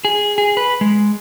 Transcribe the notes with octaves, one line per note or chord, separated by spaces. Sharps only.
G#4
G#4
B4
G#3